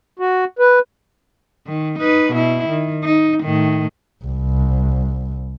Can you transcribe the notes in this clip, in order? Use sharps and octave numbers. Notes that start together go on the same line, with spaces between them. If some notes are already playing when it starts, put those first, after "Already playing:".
F#4
B4
D#3
D#4 B4
B2 E4
D#3
D#4
A2 D#3
C2